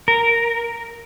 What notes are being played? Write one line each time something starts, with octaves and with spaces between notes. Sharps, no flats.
A#4